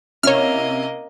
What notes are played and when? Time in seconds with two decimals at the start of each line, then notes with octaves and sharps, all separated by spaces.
0.23 C3 A#3 C#4 E4 C#5 D#5 F6